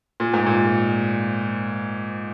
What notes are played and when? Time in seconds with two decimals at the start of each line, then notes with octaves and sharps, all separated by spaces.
0.20 A#2
0.34 G#2
0.46 A#2